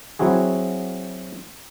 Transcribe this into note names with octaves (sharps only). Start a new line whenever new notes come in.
F#3 C4 E4 F#4 G#4